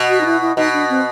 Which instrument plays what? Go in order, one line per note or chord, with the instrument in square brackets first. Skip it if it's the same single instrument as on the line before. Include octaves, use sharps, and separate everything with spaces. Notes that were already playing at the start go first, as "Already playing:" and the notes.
Already playing: [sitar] B2
[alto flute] F#4
D#4
E4
E4
[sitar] B2 [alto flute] D#4
[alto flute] D4
C4